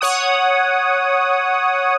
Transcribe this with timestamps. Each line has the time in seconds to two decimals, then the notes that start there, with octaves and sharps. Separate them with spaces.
0.01 C#5 F#5 D#6